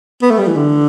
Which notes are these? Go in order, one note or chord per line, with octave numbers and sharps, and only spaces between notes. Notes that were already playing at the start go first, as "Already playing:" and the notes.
B3
A3
G3
E3
D3